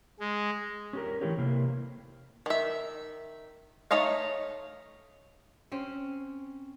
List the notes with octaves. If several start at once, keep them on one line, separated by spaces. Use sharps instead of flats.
G#3
C#4 G4 A#4
E3 A3 A#3 E4 G4 C#5
C3 A#3 E4
D#3 E5
A3 D#4 C#5 D#5 F5
C4 C#4